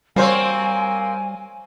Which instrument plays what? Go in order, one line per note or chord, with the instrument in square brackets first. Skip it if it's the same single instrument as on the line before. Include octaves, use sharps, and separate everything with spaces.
[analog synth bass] G3 [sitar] A#3 C4 [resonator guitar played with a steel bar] F#4 C5 C#5 [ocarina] G#5